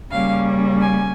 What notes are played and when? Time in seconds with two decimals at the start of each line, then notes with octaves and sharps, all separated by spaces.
0.10 C#3 G3 A#3 C#4 F5
0.81 G#5